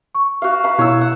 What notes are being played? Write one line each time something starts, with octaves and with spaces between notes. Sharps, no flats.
C#6
F#4 F5
F5 B5
B2 E4 C#5 E6
F#5